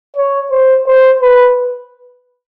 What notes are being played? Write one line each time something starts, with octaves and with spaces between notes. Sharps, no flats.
C#5
C5
C5
B4